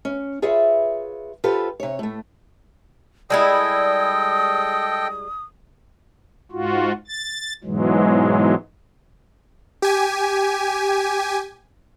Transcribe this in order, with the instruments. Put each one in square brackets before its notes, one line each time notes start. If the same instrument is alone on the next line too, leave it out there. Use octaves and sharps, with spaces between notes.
[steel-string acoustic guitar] C#4
F4 G#4 B4 C#5 E5
F4 G4 A4 B4 C5
C3 C#5
A2 A3
[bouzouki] G3 G#3 E4 [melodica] A4 D#5 G5 [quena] D#6
[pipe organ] G#2 F4 F#4
A6
G#2 B2 E3 F#3 G#3
[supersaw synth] G4 G#5